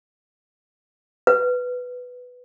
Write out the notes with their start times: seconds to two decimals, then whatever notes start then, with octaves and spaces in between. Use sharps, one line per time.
1.27 B4